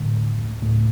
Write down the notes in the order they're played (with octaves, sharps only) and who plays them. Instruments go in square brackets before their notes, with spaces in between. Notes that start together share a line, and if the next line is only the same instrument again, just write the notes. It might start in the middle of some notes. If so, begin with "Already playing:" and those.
Already playing: [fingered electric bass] A2 D3 A3
D2
D2
A2 C#3 A3